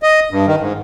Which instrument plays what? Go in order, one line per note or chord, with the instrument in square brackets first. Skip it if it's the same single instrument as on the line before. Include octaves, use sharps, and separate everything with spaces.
[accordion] D#5
G2
D#3
G#2